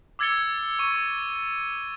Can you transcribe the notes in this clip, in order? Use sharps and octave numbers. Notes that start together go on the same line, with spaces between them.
D6 E6 G#6 A6 C#7 G7
C#6 D#7